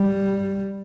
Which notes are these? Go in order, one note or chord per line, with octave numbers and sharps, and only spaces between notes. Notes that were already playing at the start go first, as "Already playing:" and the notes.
Already playing: G3